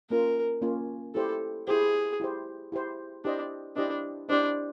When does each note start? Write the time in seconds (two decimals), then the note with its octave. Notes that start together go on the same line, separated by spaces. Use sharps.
0.10 A#3 C#4 F4 A#4
0.62 A#3 C#4 F4
1.15 E4 G4 A4 C5
1.67 E4 G4 G#4 C5
2.20 E4 G4 C5
2.72 E4 G4 C5
3.25 D4 E4 G4 C5 D#5
3.76 D4 E4 G4 C5 D#5
4.29 D4 E4 G4 C5 D#5